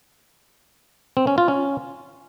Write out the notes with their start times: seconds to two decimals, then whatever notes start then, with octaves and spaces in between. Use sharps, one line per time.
1.17 C4
1.27 C#4
1.38 F4
1.48 C#4